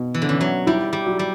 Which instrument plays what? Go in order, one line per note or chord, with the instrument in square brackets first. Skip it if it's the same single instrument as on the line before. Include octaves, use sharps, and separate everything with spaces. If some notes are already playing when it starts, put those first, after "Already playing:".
Already playing: [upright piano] B2
[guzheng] E3
D3
[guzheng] E3 [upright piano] C#4
[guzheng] F#3
[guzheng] G3 [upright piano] E4
[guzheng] G3
[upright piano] F#3
[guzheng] G3